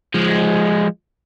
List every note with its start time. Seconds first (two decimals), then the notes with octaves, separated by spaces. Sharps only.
0.14 F3 G#3